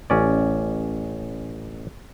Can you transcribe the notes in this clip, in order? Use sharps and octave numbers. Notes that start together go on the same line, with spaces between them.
A1 C#4 D5